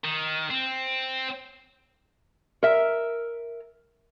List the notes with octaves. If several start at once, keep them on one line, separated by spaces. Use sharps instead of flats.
D#3
C4
A#4 E5